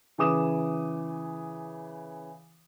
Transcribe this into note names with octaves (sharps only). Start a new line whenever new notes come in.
C#3 E3 D6 D#6 E7